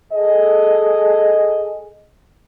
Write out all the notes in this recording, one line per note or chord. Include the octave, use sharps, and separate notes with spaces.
G#4 A4 D#5